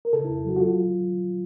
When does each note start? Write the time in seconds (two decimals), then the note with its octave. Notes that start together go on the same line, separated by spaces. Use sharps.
0.05 A#4
0.13 C#3 A4
0.25 F2 E4
0.45 F#3 F#4
0.56 F#4
0.60 F#3 F4
0.76 F#3